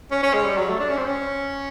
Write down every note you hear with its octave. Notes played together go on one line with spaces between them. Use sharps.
C#4
C#4
G#3
G3
F#3
A3
D4
C#4
C4
C#4